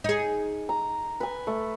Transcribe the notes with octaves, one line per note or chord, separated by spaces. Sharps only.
D#4 G#4
A#5
B4 G#5
A3